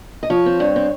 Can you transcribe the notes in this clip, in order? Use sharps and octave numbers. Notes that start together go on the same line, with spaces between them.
D#5
F3 C#5
C4
G2
C4